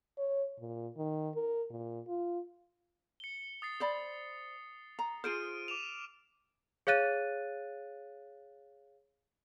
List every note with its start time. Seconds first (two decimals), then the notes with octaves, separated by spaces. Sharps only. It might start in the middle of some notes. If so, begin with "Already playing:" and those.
0.18 C#5
0.60 A#2
0.97 D#3
1.35 A#4
1.70 A#2
2.07 F4
3.20 C#7 G7
3.62 D#6 A6 C7
3.80 C5 D5 B5
4.99 A#5
5.24 F4 G#4 C5 F6 D7 D#7
5.68 D6 E7 F7
6.87 G#4 C#5 F5 F#6 A6 D#7